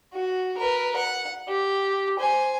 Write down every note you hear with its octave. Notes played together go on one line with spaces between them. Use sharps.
F#4
A#4 B4
F#5
G4
C5 G#5